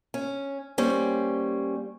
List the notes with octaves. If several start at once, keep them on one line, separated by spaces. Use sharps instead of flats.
C#4
G3 A#3 C#4 C5